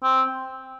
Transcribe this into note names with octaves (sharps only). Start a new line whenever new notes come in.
C4